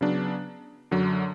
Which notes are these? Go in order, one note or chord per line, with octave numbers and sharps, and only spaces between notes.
C#3 F#3 B3 D4
F#2 D3 F#3